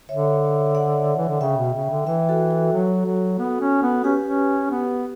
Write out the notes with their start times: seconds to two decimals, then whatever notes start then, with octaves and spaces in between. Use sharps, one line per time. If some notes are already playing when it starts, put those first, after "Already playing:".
0.09 D3 C#5 E5
0.75 D5 F#5
1.17 E3
1.28 D3
1.41 C#3 E5 G5
1.57 B2
1.74 C#3
1.90 D3
2.06 E3 E5 G5
2.29 F#4 A4
2.51 F#4 A4
2.73 F#3
3.05 F#3
3.38 B3
3.61 C#4
3.82 B3
4.04 C#4 G4 B4
4.23 C#4
4.70 B3